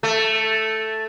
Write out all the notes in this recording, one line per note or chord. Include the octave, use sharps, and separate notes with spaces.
A3